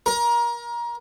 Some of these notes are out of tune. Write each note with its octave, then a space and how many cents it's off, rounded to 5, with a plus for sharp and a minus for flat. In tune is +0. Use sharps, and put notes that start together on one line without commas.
A#4 +25